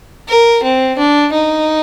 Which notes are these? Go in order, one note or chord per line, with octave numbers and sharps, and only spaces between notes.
A#4
C4
D4
D#4